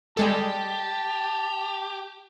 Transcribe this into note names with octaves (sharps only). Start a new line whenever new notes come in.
G3 G#3 G4 A4 A5